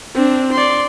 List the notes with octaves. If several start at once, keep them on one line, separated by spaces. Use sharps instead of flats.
C4 D4
D5 C6